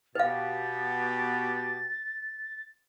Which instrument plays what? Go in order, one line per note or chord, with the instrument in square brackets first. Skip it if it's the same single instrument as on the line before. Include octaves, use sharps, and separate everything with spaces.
[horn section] B2 B3 G4 [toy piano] B4 F5 [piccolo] A6